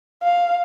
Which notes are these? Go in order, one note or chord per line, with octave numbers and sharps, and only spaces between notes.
F5